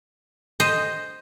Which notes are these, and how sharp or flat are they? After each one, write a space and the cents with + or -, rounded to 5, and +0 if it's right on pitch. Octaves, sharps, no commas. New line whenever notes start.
C5 +0 D#5 +0